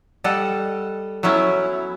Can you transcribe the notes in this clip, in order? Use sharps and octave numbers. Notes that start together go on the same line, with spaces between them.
G3 A4 D#5 F#5
F#3 B3 C#4 E4